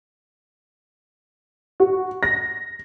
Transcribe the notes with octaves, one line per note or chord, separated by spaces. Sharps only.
F#4
A#6